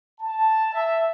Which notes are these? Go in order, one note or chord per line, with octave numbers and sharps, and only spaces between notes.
A5
E5